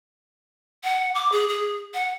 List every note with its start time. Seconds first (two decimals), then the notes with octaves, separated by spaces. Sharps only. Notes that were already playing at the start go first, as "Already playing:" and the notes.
0.84 F#5
1.15 D6
1.32 G#4
1.48 G#4
1.94 F#5